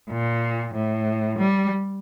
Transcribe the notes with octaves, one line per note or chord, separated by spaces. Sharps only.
A#2
A2
G3